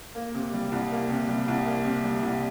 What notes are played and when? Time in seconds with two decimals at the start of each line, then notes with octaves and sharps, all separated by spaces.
0.15 A#3
0.35 C3
0.53 G3
0.72 C2
0.91 A#3
1.10 C3
1.29 G3
1.48 C2
1.66 A#3
1.85 C3
2.04 G3
2.23 C2